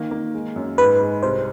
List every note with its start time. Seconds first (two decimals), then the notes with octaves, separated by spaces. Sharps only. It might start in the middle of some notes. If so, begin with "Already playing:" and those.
Already playing: D#3 A#3
0.11 A#3
0.34 G#3
0.56 F#2
0.78 G#2 B4
1.01 G#3
1.23 C2 C5